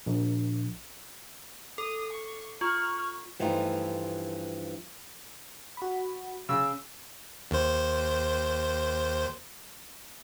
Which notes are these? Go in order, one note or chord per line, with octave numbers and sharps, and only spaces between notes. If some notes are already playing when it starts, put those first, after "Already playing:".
A#1
A4 D#6
C#6
F4 C#6 F6
G2 E3 F3 A3 D#4 F4
F#4 B5
C#3 E6
D#2 C5